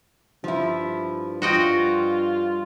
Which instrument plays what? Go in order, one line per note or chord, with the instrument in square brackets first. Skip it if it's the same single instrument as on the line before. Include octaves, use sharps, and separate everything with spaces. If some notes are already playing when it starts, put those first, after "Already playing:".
[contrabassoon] G2 [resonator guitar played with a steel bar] F3 E4
[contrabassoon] G2 [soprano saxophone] F4 [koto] F#4 D#5 G5